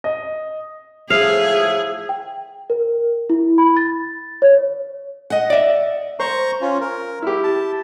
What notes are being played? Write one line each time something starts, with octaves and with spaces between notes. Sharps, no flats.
D#5
A2 F3 G#4 E5 F5
G5
A#4
E4
B5
A6
C#5
D#5 F#5
D5 E5
C5 A#5 C#6
C#4 F4
A#4
E4 G4
A5